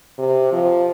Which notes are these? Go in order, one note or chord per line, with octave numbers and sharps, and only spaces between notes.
C3
F3